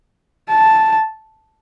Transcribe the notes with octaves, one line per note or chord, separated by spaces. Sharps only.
A5